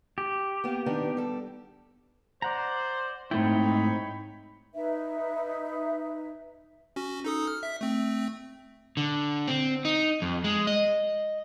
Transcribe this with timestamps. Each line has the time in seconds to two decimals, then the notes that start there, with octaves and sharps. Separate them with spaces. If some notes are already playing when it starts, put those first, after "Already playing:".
0.18 G4
0.64 A#3 B3
0.86 D#3 B3 D4
1.17 G3 A4
2.42 C5 D5 F#5 A#5
3.31 G#2 A3 C4 D#4 E4 C#5 G5 B5
4.75 D#4 B4 E5
6.96 C#4 F#4
7.24 D#4 A4 D#6
7.47 F6
7.63 E5 B6
7.81 A3 C4
8.97 D3
9.48 C4
9.85 D#4
10.22 F2
10.44 G#3
10.67 D#5